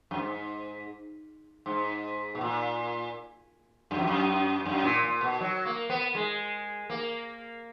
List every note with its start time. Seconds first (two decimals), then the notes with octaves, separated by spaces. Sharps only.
0.11 F#2
0.17 G#2
1.66 G#2
2.35 B2
2.41 A#2
3.91 F#2
3.99 F2
4.07 F#2
4.66 F#2
4.84 A#2
5.03 A#2
5.21 B2
5.41 F#3
5.65 A#3
5.90 B3
6.15 G#3
6.90 A#3